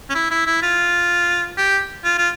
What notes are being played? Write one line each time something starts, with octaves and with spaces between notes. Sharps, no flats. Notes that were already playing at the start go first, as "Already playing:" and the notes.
C#4
E4
E4
E4
F4
G4
F4
F4